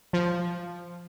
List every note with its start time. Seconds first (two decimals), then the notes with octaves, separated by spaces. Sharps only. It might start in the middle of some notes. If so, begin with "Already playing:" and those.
0.13 F3